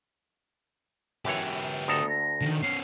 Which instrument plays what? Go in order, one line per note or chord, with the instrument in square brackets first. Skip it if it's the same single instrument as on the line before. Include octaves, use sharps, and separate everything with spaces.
[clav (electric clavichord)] F#2 E3 C#5 [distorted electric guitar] B3 G4
[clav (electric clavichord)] D2 A4 A#5 [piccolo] D#6
[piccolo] A#6
[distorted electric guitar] D3 D#3
[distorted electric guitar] B3 C#4 [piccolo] C7